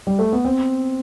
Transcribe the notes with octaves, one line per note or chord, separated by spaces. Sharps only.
G3
A3
B3
C4